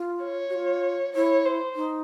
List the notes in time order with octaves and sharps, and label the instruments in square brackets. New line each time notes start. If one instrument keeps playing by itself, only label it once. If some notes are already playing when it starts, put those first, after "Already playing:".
Already playing: [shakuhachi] F4
[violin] C#5
[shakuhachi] F#4
F4
[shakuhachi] E4 [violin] C#5
[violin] C5
[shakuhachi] D#4